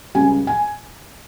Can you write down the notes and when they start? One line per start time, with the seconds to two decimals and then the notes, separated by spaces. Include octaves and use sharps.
0.15 C#2 C#3 G3 G#5
0.47 G#5